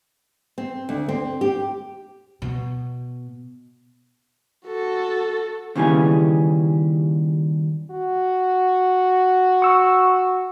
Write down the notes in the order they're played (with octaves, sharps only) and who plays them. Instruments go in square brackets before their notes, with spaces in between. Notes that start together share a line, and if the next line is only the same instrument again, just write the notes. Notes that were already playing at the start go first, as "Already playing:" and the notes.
[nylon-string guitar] C4
D2
C4
G4
[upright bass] B2
[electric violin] F#4 A4
[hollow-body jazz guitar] D#2 C#3 E3 G3 C#4 G#4
[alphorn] F#4
[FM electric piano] C#6 E6